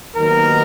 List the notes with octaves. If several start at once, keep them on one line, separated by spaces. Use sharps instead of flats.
D#2 D#3 F#3 B3 A#4